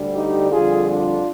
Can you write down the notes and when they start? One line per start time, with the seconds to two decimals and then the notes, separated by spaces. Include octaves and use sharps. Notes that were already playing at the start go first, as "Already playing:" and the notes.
Already playing: D2 D3 G3
0.14 D#4 G4
0.52 F2 D3 G3 F4 G#4
0.89 D4 F4